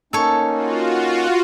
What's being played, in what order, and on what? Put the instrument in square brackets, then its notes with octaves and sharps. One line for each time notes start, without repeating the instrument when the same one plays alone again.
[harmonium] A#3 C#4 D#4 [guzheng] A4 C#5
[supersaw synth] F4 F#4